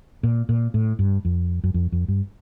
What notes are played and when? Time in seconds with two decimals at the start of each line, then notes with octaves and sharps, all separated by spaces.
0.23 A#2
0.49 A#2
0.74 A2
0.99 G2
1.25 F2
1.64 F#2
1.74 F2
1.92 F2
2.08 G2